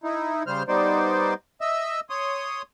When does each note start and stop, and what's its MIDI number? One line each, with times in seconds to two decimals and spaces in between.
0.04 0.43 63
0.04 0.43 64
0.47 0.63 49
0.47 0.63 55
0.47 0.63 72
0.47 0.63 89
0.68 1.34 55
0.68 1.34 59
0.68 1.34 63
0.68 1.34 72
0.68 1.34 74
1.61 2.00 75
1.61 2.00 76
1.61 2.00 88
2.10 2.62 73
2.10 2.62 84
2.10 2.62 87